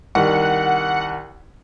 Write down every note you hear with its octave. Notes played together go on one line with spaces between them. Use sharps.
C2 D#3 F#5